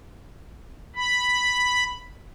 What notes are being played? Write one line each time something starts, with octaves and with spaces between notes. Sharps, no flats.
B5